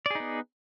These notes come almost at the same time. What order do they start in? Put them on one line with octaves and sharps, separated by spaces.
D5 G#4 D#4 B3